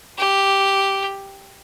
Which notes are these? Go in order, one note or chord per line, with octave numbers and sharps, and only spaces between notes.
G4